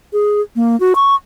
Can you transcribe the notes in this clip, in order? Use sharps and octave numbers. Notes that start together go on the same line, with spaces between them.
G#4
A#3
F#4
C#6